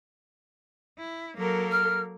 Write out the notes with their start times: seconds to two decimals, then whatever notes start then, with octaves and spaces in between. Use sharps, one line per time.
0.99 E4
1.38 F#3 A#3 A4 A#4
1.72 F6